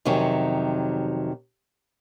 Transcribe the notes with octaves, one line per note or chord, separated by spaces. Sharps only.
F2 C3 D#3 F#3 C#4